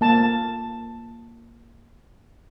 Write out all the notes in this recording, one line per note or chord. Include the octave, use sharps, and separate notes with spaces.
A#3 A5